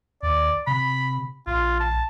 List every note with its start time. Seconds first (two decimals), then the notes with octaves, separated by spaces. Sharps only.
0.23 D#2 D5
0.67 C3 B5
1.47 A#1 F4
1.80 A5